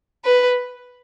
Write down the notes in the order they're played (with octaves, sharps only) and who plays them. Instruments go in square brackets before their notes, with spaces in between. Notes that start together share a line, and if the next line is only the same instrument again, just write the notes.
[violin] B4